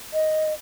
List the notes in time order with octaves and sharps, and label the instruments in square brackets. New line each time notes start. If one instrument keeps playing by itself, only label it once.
[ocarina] D#5